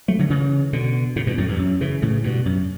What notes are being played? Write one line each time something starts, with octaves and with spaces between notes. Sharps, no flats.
F#3 A3
D3 F#3
C#3 E3
B2 D3
A2 C#3
G2 B2
F#2 A2
E2 G2
F#2
C#3 E3
A2 C#3
G2 B2
F#2